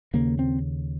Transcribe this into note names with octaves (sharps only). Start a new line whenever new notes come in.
D#2 C#3 A#3
C4